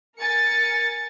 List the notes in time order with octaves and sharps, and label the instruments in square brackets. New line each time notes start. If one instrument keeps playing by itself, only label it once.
[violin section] A#4 G#5 A6 C#7